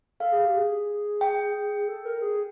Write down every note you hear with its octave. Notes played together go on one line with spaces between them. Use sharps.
A4 F5
G#4
G4
G#4
G5
A4
A#4
G#4